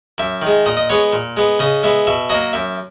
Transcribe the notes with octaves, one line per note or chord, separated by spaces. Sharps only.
F#2 E5
D#3 G#3
A#2 D#5
D#5
G#3 B3 C#5
A#2
G#3 B3
C#3 D#5
G#3 B3 E5
B2 E5
F#3 A#3 D#5
F#2 E5